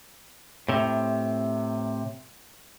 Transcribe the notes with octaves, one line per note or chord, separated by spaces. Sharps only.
A2 C3